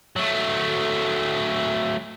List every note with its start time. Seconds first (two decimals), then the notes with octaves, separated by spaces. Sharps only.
0.16 F#3 A3